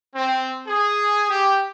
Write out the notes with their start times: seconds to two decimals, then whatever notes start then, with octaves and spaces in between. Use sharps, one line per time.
0.15 C4
0.67 G#4
1.29 G4